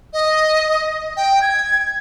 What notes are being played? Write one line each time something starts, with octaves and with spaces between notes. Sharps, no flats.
D#5
G5
G#6